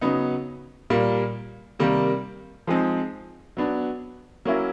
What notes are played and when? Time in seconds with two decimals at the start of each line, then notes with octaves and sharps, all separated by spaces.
0.01 C#3 F#3 B3 D#4
0.90 A#2 G3 A#3
1.79 C3 D#3 G3 A#3
2.67 F3 G#3 C4 D#4
3.57 F#3 B3 D4
4.45 F#3 A#3 C#4 E4